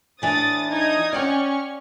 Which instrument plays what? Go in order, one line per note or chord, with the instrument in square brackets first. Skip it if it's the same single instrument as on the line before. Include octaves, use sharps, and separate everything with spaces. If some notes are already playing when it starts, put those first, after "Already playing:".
[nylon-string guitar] A2 E3 D4 [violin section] D#6 A6
[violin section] D#4 D#6 G#6
[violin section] C#4 C#6 F6 [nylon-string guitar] D5 F#5 G5